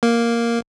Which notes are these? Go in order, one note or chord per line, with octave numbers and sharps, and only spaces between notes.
A#3